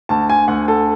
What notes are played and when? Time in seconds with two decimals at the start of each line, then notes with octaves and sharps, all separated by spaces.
0.09 D2 A5
0.30 G#5
0.48 D2 F#5
0.68 A4